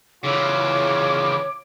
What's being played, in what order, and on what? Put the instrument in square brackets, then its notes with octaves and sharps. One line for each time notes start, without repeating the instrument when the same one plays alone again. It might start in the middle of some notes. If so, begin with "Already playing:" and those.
[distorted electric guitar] C#3 E3 [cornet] F4 [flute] C#5 [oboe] D6